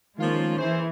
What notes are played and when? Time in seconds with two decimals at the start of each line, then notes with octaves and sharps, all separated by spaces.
0.18 D#3 F3 G#3 A#3 C#4 F4
0.58 E3 G#4 C5